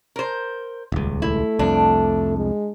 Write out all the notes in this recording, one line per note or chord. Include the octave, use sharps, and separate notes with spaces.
A#4 C5
D#1 C#2
A3 E4
C2 F2 D4
G#3